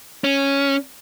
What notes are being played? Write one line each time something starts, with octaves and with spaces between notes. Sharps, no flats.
C#4